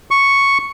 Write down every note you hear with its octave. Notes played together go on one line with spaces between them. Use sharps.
C#6